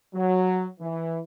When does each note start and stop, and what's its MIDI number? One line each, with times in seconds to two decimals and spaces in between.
0.14 0.67 54
0.80 1.20 52